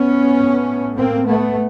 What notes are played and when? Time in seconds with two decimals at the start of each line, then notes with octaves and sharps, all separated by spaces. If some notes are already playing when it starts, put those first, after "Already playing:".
Already playing: B3 C#4
0.36 A2
0.96 A#3 C4
1.26 A3 B3